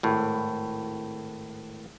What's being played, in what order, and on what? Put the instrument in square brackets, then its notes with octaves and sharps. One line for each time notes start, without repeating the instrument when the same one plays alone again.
[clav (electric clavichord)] G#1 A2